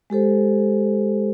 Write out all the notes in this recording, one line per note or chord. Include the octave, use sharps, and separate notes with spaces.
G#3 G4 A4 C5